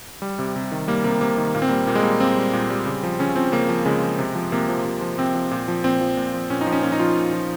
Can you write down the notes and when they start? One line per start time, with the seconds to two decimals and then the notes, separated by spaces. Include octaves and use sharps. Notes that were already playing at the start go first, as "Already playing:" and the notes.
0.22 G3
0.39 C3
0.56 C3
0.72 D#3
0.88 G3 A#3
1.04 C3 A#3
1.21 C3 A#3
1.38 D#3
1.55 A#2 A#3
1.62 C4
1.69 G3 A#3
1.87 A#2 A#3
1.95 G#3
2.03 G3 A#3
2.20 A#2 C4
2.37 G3
2.53 A#2
2.70 G3
2.86 C#3
3.03 F3
3.19 C#3 C#4
3.36 F3 C4
3.52 C#3 A#3
3.69 F3
3.86 C#3 G#3
4.03 F3
4.19 C3
4.35 F3
4.52 C3 A#3
4.69 F3
4.85 C3
5.01 F3
5.18 C3 C4
5.35 F3
5.51 A#2
5.68 F3
5.84 A#2 C4
6.01 F3
6.17 A#2
6.34 F3
6.50 A#2 C#4
6.61 D#4
6.67 F3
6.72 C#4
6.83 A#2 C#4
6.92 D#4
7.00 F3 F4
7.17 A#2
7.33 F3